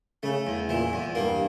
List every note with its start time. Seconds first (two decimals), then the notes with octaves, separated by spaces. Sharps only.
0.23 C#3 A3
0.47 E2
0.69 A#2 E3
0.93 E2
1.15 G2 A#3